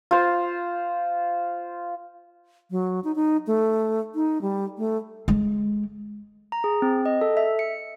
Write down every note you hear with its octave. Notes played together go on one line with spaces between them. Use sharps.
F4 C5
F#3
D#4
D#4
A3
D#4
G3
A3
G#3
A#5
G#4
C4
D#5
A4
E5
C#7